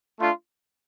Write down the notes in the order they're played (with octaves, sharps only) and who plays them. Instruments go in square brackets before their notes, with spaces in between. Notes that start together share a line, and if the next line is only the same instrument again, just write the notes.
[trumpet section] A3 D4 F4